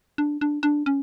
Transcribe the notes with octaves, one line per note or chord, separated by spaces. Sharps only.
D4
D4
D4
C#4